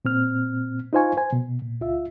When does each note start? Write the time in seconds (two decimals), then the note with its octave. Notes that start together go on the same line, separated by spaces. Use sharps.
0.05 A#2 C4 F6
0.93 D#4 F4 C5 F5 G#5 C#6
1.17 C5 G#5
1.33 B2
1.62 A#2
1.81 C#2 F4 E5